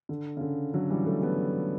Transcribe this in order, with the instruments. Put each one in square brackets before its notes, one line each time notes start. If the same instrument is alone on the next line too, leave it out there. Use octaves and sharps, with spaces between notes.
[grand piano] D3
C#3
D3
D3 F#3
E3 G3
F#3 A3
G3 B3